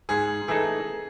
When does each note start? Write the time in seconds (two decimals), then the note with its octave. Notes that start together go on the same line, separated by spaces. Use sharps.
0.09 G#2 G#4
0.48 E3 A3 D#4 G#4 A4